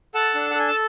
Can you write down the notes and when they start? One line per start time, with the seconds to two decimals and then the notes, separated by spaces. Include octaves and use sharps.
0.15 A4 F#5 A5
0.35 D4
0.50 F#5
0.55 A4 G#5
0.68 A5